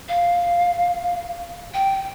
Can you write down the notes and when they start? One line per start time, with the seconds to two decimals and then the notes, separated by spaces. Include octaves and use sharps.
0.09 F5
1.74 G5